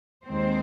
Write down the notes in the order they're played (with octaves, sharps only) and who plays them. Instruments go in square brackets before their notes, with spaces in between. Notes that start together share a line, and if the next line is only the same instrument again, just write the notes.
[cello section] D#2 D#3 G#3 C4 C5